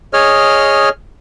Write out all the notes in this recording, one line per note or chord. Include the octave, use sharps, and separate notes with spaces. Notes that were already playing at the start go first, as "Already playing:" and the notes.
G#4 C#5 D#5 F6